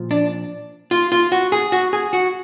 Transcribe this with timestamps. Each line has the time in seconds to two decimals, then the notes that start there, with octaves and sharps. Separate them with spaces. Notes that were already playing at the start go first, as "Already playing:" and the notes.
Already playing: A#2 F3
0.11 D4
0.91 F4
1.12 F4
1.32 F#4
1.52 G#4
1.72 F#4
1.93 G#4
2.13 F#4